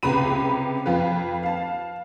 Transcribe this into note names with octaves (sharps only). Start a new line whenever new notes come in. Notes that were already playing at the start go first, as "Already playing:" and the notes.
C#2 C3 B4 A#5 B5 D#7
F2 F4 B4
F5 A5